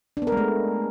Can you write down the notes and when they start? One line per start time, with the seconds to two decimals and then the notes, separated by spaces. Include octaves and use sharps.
0.17 D4
0.22 B3
0.27 A#4
0.32 G#3
0.37 A3